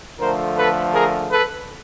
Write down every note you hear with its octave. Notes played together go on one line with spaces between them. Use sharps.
D3 F3 A3 A#4 C5
A4 B4
G#4 A#4
A4 B4